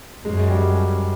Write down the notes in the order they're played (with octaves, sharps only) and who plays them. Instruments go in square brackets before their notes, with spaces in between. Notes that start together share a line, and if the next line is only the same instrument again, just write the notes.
[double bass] F#2 [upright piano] G#3
[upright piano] G3